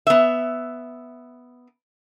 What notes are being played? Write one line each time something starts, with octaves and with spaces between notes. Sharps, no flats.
B3 E5